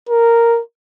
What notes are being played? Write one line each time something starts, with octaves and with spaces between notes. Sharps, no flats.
A#4